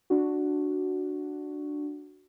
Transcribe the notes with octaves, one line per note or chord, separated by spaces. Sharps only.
D4 F#4